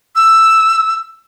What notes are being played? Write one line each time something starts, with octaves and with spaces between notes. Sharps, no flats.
E6